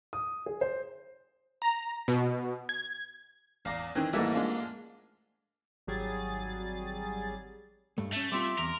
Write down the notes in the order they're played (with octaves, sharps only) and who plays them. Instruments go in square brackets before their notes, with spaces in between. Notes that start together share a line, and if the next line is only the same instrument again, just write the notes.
[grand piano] D#6
G#4
C5
[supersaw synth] A#5
B2
G#6
[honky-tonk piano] E2 D5 [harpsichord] F5 A#5 C6
[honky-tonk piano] D#3 E3 [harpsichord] C4
[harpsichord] G#2 A3 A#3 [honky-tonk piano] E3 G3 E4
[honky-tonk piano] G#3 D4 F4
[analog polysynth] G#1 F#3 G3 G#4 A6
[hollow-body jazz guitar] G2 A3
[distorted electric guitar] A3 [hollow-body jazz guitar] C#4 E5
[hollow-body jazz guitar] G3 C4 F4 [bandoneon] E5 D6 [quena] C6
[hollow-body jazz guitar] E2 [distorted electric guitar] A#4